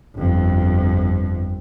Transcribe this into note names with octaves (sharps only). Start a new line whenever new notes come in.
G1 F2